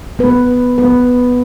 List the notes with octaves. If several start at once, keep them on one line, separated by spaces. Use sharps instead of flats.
B3 B4
B3 B4